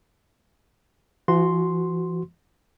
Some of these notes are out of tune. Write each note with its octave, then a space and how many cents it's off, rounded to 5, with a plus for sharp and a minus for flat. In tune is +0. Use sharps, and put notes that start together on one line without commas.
E3 +45 F#4 +0 C6 +0